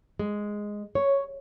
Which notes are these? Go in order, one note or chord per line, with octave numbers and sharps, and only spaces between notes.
G#3
C#5